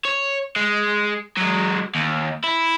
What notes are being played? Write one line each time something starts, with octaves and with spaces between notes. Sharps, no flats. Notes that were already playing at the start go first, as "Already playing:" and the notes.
C#5
G#3
F#3 G#3
D#2
E4